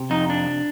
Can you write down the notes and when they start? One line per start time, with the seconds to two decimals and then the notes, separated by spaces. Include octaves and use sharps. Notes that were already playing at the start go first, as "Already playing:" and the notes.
Already playing: C3
0.10 F2 D#4
0.30 D4